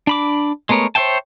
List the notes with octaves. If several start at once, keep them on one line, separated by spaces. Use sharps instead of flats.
D4 B5 D6
G#3 A3 B3 A#4 C#5
C5 C#5 E5 G5 A5